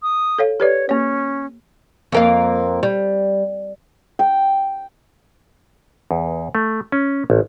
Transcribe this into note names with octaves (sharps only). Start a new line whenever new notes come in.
D#6
A4 C#5 F5
G4 B4 C#5 D5
A#3 C#4 C#5
F2 A#3 F5
G3
G5
E2
A3
C#4
A1